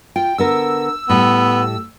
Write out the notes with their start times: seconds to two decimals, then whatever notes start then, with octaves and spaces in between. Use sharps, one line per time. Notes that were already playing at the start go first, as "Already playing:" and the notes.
0.16 F4 G5
0.38 D3 B3 A#4 E6
1.10 A2 G3 B3